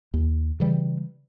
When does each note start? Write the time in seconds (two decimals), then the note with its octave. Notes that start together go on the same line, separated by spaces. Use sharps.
0.14 D#2
0.60 C#3 E3 G3